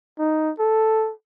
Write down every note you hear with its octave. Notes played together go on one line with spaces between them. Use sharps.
D#4
A4